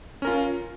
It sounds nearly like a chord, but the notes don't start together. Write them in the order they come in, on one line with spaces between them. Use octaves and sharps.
C#4 A#4 F4